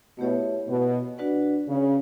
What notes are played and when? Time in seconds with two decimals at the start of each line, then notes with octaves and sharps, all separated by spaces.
0.18 B2 A3 E4 G4 C#5 E5
0.68 B2
1.18 D4 F#4 B4 D5 F#5
1.67 C#3